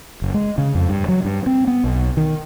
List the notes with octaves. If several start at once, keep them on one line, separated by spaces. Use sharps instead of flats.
F#1
G#3
C#3
F2
G2
F#3
G2
C4
B3
B1
D#3